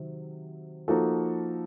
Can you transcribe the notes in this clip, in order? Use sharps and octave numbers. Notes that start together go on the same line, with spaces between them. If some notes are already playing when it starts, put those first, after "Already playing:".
Already playing: C3 D#3 F#3
F3 A#3 D#4 F#4 A4